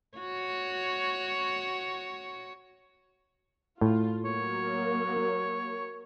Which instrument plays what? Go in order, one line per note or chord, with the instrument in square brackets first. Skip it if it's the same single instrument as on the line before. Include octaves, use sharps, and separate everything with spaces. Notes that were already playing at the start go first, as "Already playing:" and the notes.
[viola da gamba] F#4 C#5
[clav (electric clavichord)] A2 [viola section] F4
[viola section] F#3 A#3 [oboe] C#5